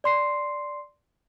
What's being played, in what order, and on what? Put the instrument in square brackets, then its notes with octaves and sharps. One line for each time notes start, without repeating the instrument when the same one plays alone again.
[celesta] D5 C6 C7